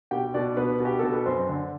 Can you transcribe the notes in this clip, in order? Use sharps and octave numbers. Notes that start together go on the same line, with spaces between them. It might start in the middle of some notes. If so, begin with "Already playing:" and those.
B2 G4 G5
B2 D4 D5
B2 B3 B4
B2 G4
B2 A4
B4
F#2 C4 C5
D3